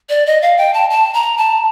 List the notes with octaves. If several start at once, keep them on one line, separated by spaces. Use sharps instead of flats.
D5
D#5
F5
G5
A5
A5
A#5
A5